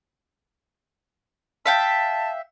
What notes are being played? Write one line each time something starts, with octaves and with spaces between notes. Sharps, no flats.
E5 F5 G5 A5